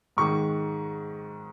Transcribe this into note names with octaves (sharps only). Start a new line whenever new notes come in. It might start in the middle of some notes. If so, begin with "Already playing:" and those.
G#2 D#3 G#3 C#6